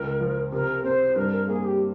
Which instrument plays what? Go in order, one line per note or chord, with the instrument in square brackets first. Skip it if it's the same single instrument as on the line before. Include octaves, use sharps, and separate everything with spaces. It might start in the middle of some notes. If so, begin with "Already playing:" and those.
Already playing: [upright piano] C#2 [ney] A#4
[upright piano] F3
[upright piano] C3 [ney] A#4
[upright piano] C4 [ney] C5
[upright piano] G2 [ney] A#4
[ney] A#4
[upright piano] A#3 [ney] G#4
[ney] G4